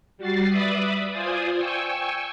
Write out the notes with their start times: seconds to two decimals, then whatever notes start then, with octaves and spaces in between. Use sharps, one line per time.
0.17 G3 F#4 A6 C7
0.47 B4 D5 E5 B5 D6 D#6
1.12 F4 C5 D5 G#5 D#6
1.56 G5 G#5 C#6 E6